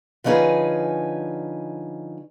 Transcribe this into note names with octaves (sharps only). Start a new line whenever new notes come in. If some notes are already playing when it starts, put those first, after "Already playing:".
D3 F3 C#4 D#4 G#4 B4